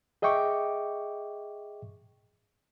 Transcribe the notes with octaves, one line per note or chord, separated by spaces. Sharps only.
G#4 D#5 E5 G5 C#6 D6